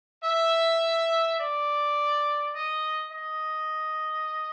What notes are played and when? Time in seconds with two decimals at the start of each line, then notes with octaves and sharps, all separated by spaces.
0.22 E5
1.38 D5
2.54 D#5
3.11 D#5